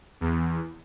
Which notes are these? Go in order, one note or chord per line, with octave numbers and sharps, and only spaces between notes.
E2